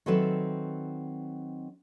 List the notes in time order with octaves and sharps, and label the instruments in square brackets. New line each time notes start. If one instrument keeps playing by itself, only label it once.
[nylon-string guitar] D#3 F#3 C4 A4 B4 E5